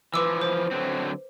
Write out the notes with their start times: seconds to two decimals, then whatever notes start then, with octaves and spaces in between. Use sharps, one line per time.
0.14 E3 F3 B4 D6 E6
0.41 C5
0.71 D3 F#3 C4